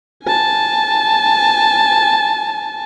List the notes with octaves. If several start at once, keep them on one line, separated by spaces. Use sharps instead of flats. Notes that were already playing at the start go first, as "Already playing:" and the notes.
G#5 A5